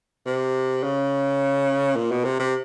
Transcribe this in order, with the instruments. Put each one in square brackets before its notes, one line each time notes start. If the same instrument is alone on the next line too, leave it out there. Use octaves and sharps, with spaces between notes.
[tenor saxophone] C3
C#3
A#2
B2
C3
C3